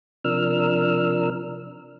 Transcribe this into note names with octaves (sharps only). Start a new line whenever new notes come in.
C3 F3 D4 A#4 E6 F6